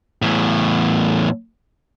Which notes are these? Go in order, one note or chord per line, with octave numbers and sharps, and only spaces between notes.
E2 A2